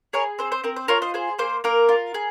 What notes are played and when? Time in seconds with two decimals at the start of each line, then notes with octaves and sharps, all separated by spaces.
0.13 G#4 A#4 C#5
0.39 C4 C5
0.52 C5
0.64 C4 A#4
0.76 C5
0.88 F4 A#4 C#5
1.02 C5 D#5
1.14 G#4 C5
1.39 A#3 C5
1.64 A#3 A#4
1.89 F4
2.14 G#4